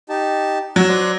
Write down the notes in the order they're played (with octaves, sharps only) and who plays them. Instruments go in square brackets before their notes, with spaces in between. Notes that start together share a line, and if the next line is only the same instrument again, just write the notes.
[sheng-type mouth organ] D#4 G4 A5
[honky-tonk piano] F#3 [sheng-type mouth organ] F#4 E6 F#6
[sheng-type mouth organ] C5 D5 F#6